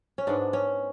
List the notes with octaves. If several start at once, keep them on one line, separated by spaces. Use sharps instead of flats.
C#4
G#2 G#3 B3 D4
C#4